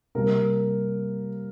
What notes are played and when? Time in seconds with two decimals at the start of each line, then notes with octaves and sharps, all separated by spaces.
0.15 C3 G3 A#3 A#4